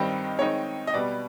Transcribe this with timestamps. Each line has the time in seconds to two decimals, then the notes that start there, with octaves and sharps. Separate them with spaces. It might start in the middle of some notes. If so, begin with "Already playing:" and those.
Already playing: G2 D#3 G3 C4 D#4
0.39 D#3 G#3 C4 D#4 C#5
0.87 D#5
0.94 B2 G3 B3 D5